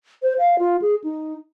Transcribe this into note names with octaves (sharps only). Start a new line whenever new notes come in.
C5
F5
F4
G#4
D#4